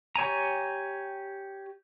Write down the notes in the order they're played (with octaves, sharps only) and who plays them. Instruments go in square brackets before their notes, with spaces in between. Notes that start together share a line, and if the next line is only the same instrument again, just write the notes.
[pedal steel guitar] G4 C#5 G#5 A#5